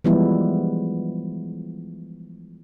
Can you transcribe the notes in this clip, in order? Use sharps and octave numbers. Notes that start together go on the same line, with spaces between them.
E3 F3 G3 G#3 B3 E4